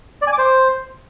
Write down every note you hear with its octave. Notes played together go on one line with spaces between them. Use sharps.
D5
G#5
D6
C5